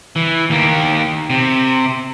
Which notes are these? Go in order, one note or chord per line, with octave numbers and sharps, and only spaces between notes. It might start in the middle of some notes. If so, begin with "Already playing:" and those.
E3
D#2 A#3
C3